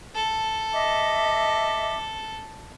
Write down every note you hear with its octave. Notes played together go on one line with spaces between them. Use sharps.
A4
D#5 E5 D6